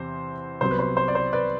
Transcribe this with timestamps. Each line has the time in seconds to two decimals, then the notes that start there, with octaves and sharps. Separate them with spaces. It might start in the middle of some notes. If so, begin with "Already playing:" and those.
Already playing: E2 C3 C5 C6
0.61 C2 C3 F#3 B3 C5
0.71 B4
0.79 C5
0.97 C5
1.08 D5
1.15 C5
1.33 B4 D5